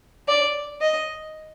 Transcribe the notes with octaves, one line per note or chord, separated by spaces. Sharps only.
D5
D#5